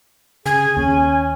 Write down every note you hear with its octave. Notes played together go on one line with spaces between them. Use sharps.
C#3 G#4 G#5
D#2 C#4